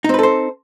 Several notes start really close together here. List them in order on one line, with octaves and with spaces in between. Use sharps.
D#4 C4 B4 A4 C5